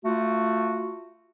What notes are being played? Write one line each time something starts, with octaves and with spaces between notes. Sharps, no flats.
A3 F4 F#4